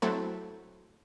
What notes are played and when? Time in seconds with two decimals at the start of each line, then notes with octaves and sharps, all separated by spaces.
0.02 F#3 A3 C4 E4 A4